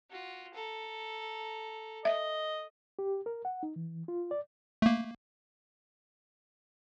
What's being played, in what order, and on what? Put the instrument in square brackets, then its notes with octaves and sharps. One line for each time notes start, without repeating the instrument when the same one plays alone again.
[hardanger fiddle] F4 F#4
A4 A#5
[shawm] D#5 [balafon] E5
[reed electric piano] G4
A#4
F#5
D#4
E3
F4
D5
[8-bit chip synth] A3 A#3